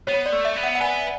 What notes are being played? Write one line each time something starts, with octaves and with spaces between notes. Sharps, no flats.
B3 C#5
D5
A3
E5
B3
F#5
F#5
B3 G#5